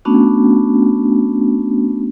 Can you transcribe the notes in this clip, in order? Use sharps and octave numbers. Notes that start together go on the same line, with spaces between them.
A3 B3 C#4 D4 F#4